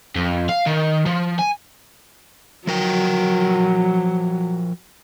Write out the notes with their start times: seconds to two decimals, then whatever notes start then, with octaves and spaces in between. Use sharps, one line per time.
0.15 F2
0.49 F5
0.67 D#3
1.06 F3
1.39 G#5
2.67 F3 F#3 A#4 G5